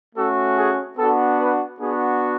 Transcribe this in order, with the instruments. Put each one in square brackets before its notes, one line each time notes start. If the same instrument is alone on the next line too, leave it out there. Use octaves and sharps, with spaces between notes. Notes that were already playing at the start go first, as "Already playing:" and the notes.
[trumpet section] A3 C#4 F#4 A4
G#4
B3 D4 F#4 A4
B4
B3 D4 F#4 G#4